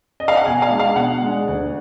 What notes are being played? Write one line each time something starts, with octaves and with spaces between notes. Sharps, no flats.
D#5
F5
F#5
B2 G#5
F5
G#3 D4
F5
B2 F#5
G#3 D4
D2